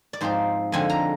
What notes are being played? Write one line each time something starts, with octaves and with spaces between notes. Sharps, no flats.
D5
G#2 F3 C4 D#4 C5
F2 D3 G#3 C4 G#5
A#5